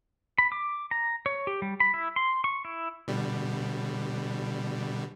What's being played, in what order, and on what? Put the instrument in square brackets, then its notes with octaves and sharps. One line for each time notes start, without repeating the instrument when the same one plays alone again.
[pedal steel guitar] B5
D6
A#5
C#5
G4
G3
B5
E4
C6
C#6
E4
[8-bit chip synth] B2 D3 G3